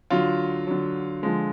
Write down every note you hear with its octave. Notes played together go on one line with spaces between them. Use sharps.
D3 F#3 F4
D3 F#3
D3 F3 G#3